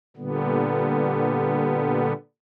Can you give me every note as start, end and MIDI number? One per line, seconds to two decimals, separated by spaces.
0.17 2.13 46
0.17 2.13 50
0.17 2.13 55
0.17 2.13 59